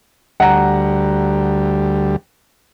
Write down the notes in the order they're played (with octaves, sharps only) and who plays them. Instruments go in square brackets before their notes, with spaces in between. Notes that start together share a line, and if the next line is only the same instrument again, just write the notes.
[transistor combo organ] D2 G3 [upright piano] F#5 A#5